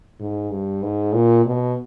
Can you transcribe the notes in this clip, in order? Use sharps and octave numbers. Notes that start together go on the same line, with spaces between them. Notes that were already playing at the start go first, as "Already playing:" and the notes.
G#2
G2
G#2
A#2
B2